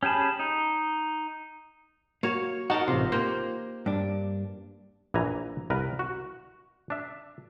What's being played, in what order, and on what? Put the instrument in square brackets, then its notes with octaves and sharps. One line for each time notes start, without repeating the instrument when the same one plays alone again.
[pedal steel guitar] C#4 G4 G#4 A5 B5
D#4
[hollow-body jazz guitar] A#3 F#4 [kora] C#5 [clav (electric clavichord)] F5
[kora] D#4 A#4 [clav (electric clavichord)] F#4 A5 [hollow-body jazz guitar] F#5
[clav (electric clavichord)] A1 C3 [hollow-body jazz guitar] F4
[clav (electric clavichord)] A#3 G4 [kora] C5
[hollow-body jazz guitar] G2 D4
[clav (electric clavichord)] A#1 E3 G#5 A#5
C2 A#4 B4
F#4
D4 E5